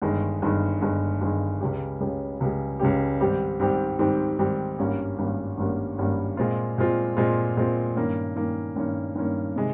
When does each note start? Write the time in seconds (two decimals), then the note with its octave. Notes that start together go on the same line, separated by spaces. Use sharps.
0.02 G1 G2 D#3 G#3
0.42 G1 G2 D#3 G#3
0.81 G1 G2 D#3 G#3
1.21 G1 G2 D#3 G#3
1.60 C#2 C#3 G#3 C#4 G4
2.00 C#2 C#3 G#3 C#4 G4
2.40 C#2 C#3 G#3 C#4 G4
2.80 C#2 C#3 G#3 C#4 G4
3.20 G#2 D#3 G3 C4 G4
3.60 G#2 D#3 G3 C4 G4
3.99 G#2 D#3 G3 C4 G4
4.39 G#2 D#3 G3 C4 G4
4.79 G#1 G2 G3 A#3 C#4
5.18 G#1 G2 G3 A#3 C#4
5.58 G#1 G2 G3 A#3 C#4
5.98 G#1 G2 G3 A#3 C#4
6.37 A#2 G#3 C4 F4
6.78 A#2 G#3 C4 F4
7.17 A#2 G#3 C4 F4
7.57 A#2 G#3 C4 F4
7.97 G2 D#3 A#3 C#4
8.36 G2 D#3 A#3 C#4
8.76 G2 D#3 A#3 C#4
9.15 G2 D#3 A#3 C#4
9.56 C3 D#3 G#3